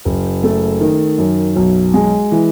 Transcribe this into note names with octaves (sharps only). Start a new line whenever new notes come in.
F#1
A3
D#3
F#2
B1
G#3
E3